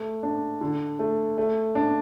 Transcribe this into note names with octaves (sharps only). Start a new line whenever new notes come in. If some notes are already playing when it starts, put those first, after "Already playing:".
Already playing: A3
D4
D3
A3
A3
D4